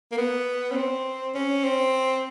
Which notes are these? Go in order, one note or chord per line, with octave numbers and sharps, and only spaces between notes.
A#3
B3
C#4
C4
C#4
C4